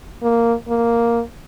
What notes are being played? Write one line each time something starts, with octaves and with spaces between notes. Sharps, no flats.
A#3
A#3